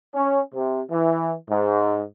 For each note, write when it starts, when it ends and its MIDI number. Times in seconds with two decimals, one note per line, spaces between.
0.14 0.39 61
0.53 0.81 48
0.90 1.32 52
1.49 2.00 44